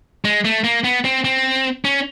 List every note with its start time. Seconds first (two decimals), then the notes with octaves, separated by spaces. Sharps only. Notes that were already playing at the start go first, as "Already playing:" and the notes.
0.25 G#3
0.45 A3
0.64 A#3
0.84 B3
1.05 C4
1.25 C4
1.85 C#4